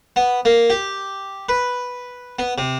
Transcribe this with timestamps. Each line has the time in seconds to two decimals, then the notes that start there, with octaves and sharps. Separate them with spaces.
0.16 B3
0.45 A#3
0.70 G4
1.49 B4
2.39 B3
2.58 C3